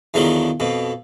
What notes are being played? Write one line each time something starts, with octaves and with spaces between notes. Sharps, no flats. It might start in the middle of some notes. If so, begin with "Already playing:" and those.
E2 D3 D#3 F3 F#3
F2 B2